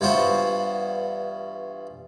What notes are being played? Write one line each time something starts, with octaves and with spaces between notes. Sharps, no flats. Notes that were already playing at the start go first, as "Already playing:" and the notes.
G2 E3 B3 F4 F#4 C5